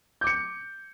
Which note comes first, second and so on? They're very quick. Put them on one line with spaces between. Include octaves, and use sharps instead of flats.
G6 D6 C#7